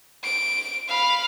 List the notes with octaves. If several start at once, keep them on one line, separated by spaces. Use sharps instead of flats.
D7
F5 B5